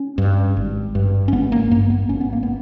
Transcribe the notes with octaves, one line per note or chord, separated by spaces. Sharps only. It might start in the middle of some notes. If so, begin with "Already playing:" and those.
Already playing: C#4
G2
G#1
G2
C#4
G#1 B3
A#3
G2 A#3
B3
G#1 C#4
B3
A#3
B3